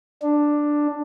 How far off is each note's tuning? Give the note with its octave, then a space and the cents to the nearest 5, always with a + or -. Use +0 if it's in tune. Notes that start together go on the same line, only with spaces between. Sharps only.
D4 +5